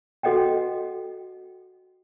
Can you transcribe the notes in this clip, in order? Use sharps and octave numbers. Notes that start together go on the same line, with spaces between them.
F#4 A4 D#5 F#5 G5